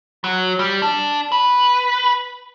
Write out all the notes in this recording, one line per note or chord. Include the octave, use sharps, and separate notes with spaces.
F#3
G3
D4
B4